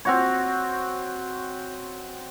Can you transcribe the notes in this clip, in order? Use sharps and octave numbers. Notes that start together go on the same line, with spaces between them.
C4 F#4 C#5